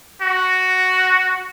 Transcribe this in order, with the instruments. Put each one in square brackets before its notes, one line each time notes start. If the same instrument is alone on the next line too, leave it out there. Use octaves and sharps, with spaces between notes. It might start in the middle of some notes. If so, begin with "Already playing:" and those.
[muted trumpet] F#4